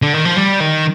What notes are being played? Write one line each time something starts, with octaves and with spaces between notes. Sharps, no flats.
D3
D#3
F3
G3
D#3